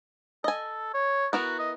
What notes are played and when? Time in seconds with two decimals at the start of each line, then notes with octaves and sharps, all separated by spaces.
0.44 A4 D#5 G#5
0.94 C#5
1.33 B3 E4 F#4 A#4
1.59 D#5